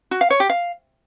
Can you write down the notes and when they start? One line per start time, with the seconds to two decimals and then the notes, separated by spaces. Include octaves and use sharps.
0.11 F#4
0.21 F5
0.30 C#5
0.40 G4
0.49 F5